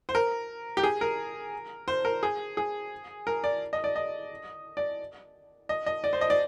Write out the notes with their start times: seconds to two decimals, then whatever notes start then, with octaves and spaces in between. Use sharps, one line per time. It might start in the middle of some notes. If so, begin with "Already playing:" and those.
0.09 C5
0.15 A#4
0.77 G4
0.83 G#4
1.01 A#4
1.88 C5
2.05 A#4
2.23 G#4
2.57 G#4
3.27 A#4
3.44 D5
3.73 D#5
3.84 D5
3.96 D#5
4.77 D5
5.69 D#5
5.86 D#5
6.04 D5
6.13 C5
6.21 D#5
6.30 D5